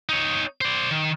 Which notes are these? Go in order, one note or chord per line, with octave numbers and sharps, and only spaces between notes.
D#4 C#5
C5 D5
D#3